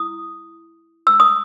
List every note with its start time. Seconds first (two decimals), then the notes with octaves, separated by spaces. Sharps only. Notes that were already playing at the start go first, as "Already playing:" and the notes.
Already playing: E4 D#6
1.07 E6
1.20 D#6